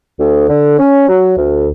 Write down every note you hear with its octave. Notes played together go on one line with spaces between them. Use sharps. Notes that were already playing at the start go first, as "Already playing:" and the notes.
D2
D3
C#4
F#3
D2